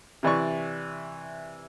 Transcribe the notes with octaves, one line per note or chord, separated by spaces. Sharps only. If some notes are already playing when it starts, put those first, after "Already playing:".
C3 E3 D5 C#6